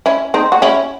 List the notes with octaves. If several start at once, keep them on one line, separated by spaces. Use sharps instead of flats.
C#4 E4
C4 D#4
F#4
C#4 E4